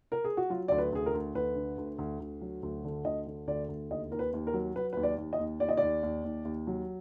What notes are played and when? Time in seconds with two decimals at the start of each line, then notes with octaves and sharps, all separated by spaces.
0.12 A#4
0.25 G#4
0.37 F#4
0.50 F#3 F4
0.68 D2 D5
0.78 B4
0.92 D2 G#4
1.06 A#4
1.14 D2
1.35 D2 B4
1.56 D3
1.78 D2
1.98 D2
2.20 D2
2.41 F#3
2.63 D2
2.84 D3
3.05 D2 D#5
3.27 D3
3.47 D2 D5
3.69 D2
3.90 D#2 D#5
4.12 D#2 A#4
4.19 B4
4.33 D#2
4.47 A#4
4.54 F#3
4.76 F#3 B4
4.93 D#2 B4
5.03 D5
5.18 D#2
5.33 D#5
5.40 D#2
5.60 D#2 D5
5.69 D#5
5.77 D#2 D5
6.03 D#2
6.24 D#2
6.45 D#2
6.67 F#3